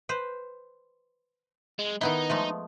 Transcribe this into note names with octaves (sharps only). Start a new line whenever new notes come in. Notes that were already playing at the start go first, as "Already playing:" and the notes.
B4 C5
G#3
D#3 B3 D#4 E4
F3 G#3 A3